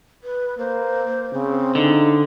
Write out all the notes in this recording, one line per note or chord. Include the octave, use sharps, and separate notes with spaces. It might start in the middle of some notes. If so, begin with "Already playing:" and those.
B4
A#3 C5
C#3 C4
D3 D#4